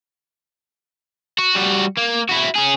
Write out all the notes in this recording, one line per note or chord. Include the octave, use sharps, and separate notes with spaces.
F#4
G3 F#4
A#3
E4 F#4
C#4 G#4